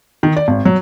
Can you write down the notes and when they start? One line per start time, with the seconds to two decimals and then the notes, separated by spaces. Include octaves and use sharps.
0.23 D#3
0.36 D5
0.48 G#1
0.65 F#3